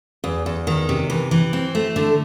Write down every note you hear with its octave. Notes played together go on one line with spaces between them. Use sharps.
E2
E2
D#3
C3
E3
E3
C4
A3
D3